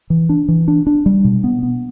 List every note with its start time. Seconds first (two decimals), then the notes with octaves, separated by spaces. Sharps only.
0.10 E3
0.29 D4
0.48 E3
0.68 D4
0.87 D4
1.06 G3
1.25 B2
1.44 B3
1.63 B3